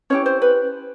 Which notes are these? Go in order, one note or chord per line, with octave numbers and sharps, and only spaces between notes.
C#4 E4 G4 C#5
C5
B4